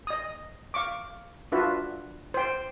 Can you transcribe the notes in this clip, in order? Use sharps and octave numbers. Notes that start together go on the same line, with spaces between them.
D#5 D#6
F5 C#6 D6
D4 F4 F#4 B4 E5
C5 G5